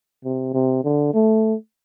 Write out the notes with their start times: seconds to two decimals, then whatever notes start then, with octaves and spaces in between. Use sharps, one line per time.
0.24 C3
0.54 C3
0.84 D3
1.14 A3